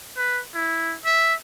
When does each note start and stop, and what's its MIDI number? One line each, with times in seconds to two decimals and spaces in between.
0.17 0.40 71
0.55 0.95 64
1.05 1.34 76